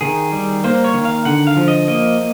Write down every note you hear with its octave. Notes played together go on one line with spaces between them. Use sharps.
D#3 G#4
G3
A#3 C5
C#5
D#3
F5
D3 F#5
F5
F3
D#5
A#3 D#5